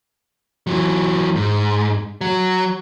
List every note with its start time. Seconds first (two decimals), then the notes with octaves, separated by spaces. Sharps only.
0.67 E3 F#3
1.36 G#2
2.21 F#3